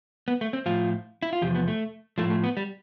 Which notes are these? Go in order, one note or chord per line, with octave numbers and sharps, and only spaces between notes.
B3
A3
C4
A2 F3 F4
E4
F4
E2 C3 F3 G4
B3
A3
A2 F3 A3
A3
B3
G3